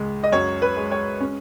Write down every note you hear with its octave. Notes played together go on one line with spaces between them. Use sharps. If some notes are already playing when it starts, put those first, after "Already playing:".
Already playing: C#2 G#3
D#5
F#2 C#5
B4
G#3
C#5
C#4